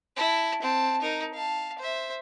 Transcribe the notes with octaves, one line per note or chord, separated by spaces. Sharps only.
E4 A5
C4 A5
D#4 A#4
F5 A5
C5 E5